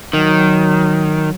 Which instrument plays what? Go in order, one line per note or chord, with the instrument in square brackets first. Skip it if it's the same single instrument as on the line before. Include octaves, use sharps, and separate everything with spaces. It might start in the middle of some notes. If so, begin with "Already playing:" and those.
[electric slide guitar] D#3 [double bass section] F#3